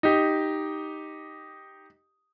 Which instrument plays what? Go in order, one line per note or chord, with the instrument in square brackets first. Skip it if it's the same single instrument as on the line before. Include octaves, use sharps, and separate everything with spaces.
[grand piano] D#4 G4